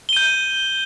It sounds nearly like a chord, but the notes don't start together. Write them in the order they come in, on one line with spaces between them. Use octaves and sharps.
G7 D#7 G6